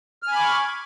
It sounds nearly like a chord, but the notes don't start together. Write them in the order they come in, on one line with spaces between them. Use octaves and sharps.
F6 G#5 B5 D6 C#6